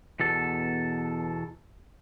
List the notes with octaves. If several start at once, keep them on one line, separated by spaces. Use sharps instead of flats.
E2 B2 A4